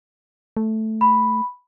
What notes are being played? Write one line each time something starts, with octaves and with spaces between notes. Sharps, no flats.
A3
B5